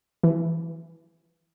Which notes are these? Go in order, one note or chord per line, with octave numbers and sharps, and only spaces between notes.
E3